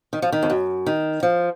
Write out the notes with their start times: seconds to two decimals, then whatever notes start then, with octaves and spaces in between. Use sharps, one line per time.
0.13 D#3
0.22 F3
0.32 D#3
0.43 F2
0.50 F#2
0.86 D#3
1.23 F3